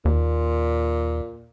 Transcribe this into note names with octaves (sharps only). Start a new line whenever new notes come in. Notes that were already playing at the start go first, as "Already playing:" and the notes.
D#2 A#2